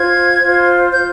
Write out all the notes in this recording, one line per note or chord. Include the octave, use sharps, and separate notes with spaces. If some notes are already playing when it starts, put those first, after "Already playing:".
Already playing: F4 C5 G#6
F4 C5
F4 C5 G6